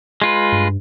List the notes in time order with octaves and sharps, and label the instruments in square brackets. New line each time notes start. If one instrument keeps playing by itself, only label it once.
[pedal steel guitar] G#3 F4 B4
[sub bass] G2